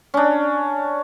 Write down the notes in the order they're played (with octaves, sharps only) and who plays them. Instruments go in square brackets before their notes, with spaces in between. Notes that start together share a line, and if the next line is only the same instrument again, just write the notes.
[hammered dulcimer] C#4 D4